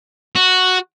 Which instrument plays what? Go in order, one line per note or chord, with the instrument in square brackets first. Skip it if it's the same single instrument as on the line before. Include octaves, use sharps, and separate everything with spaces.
[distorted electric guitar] F#4